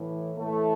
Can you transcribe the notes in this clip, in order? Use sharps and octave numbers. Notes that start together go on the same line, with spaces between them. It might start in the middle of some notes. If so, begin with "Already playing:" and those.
Already playing: A2 E3
A2 E3 A3